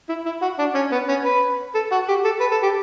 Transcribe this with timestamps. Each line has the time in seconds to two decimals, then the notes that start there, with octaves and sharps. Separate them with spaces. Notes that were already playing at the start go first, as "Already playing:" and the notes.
0.09 E4
0.25 E4
0.42 F#4
0.58 D4
0.75 C#4
0.92 B3
1.09 C#4
1.25 B4
1.75 A4
1.92 F#4
2.08 G4
2.24 A4
2.41 B4
2.51 A4
2.63 G4